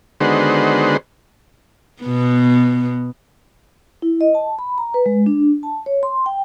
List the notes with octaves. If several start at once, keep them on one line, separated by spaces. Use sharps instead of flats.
D3 D#3 G#3 B3 F#4 C5
B2 B3
E4
D#5
A5
B5
A#5
B4
G#3
D4
A5
C#5
C6
G5